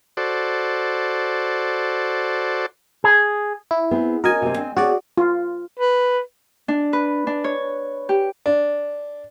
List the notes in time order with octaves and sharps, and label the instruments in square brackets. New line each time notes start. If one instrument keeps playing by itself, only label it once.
[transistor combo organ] F#4 A4 C5 D5
[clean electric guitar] G#4
[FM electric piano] E4
[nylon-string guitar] B3 C4 G#4
[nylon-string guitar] C#4 F#4 [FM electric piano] A#4 D#5 G#5
[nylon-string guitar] C3 C4
C4 D#5 G#5
[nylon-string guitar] C4 G#4 C#5 [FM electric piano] F#4 D5
[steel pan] F4
[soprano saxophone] B4
[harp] D4
B4
D4
C#5
G4
[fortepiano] D4